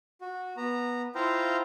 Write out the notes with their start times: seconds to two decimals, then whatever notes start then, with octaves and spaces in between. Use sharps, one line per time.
0.21 F#4
0.57 B3 A#5
1.15 E4 F4 C5 F5 G5 A#5